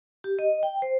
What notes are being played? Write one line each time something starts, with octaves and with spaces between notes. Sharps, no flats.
G4
D#5
G5
C5